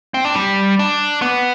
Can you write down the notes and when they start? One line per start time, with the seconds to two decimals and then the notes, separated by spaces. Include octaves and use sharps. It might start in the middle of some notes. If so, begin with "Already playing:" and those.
0.14 C4
0.25 D4
0.35 G3
0.79 D4
1.22 B3